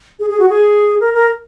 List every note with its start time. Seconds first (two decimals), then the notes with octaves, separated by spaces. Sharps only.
0.19 G#4
0.30 G#4
0.39 F#4
0.49 G#4
1.01 A#4
1.14 A#4